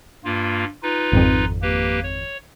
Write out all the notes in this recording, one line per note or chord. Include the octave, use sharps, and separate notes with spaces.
G2 A#3 F4
D#4 F4 B4
G#1 F2
A#3 G4 B4
C#5